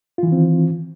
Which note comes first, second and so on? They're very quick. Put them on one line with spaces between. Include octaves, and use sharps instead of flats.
F4 E3 D#3 C4